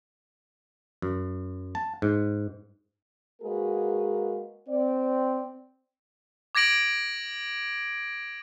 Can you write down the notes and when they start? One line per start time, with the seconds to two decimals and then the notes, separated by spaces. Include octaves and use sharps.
1.02 F#2
1.75 A5
2.02 G#2
3.42 G#3 A#3 F#4 G#4 A#4 B4
4.69 C4 D5
6.55 D6 G#6 A#6 D7 F#7